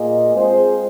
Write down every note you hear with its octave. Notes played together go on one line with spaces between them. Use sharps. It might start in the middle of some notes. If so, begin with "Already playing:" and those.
Already playing: A#2 A#3 F4 G#4 D#5
G#3 C4 F4 G#4 C5